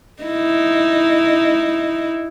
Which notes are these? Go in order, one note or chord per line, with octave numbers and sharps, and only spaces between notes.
D#4 E4